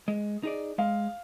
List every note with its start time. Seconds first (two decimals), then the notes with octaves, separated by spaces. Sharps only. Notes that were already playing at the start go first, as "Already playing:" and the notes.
0.08 G#3
0.43 D#4 G#4 D5
0.78 G#3 F5